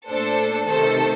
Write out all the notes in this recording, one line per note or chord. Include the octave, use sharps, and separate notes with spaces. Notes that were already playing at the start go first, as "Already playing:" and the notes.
A#2 A3 D4 A4 C5
C3 D#3 A3 A4 C5